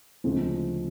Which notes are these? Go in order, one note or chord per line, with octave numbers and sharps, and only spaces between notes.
D2 C#3 F3 G#3